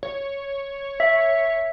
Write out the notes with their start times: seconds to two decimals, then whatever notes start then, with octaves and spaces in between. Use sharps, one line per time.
0.03 C#5
1.00 E5